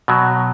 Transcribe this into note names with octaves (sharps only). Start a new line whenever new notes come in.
B2 F#3